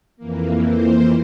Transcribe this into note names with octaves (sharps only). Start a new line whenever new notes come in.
F2 E3 A#3
C5